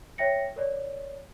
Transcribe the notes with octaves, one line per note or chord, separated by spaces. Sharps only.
C#5 E5 G5 A#6 C#7
A#4 C#5 D5